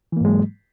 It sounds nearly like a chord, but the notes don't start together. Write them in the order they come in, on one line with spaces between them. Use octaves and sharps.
E3 A#3 G#2 G#3 F#3